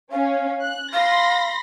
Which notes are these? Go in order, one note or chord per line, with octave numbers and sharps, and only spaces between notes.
C#4 F5
F#6
F5 B5 C6 A#6